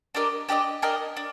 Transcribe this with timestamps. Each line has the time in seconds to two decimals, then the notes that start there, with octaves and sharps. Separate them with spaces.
0.15 D4 G4 A#4 D#5
0.49 D4 G4 A#4 D#5
0.82 D4 G4 A#4 D#5
1.17 D4